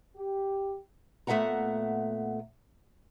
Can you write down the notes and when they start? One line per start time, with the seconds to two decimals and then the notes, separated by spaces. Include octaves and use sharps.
0.17 G4
1.27 A#2 A3 B3 E5 F#5 A#5